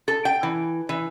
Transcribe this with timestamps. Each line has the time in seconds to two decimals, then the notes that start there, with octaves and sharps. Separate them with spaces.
0.08 A4
0.25 G5
0.43 E3
0.89 E3